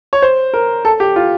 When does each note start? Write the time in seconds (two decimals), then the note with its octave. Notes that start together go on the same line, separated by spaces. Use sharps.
0.13 C#5
0.22 C5
0.54 A#4
0.85 A4
1.00 G4
1.16 F4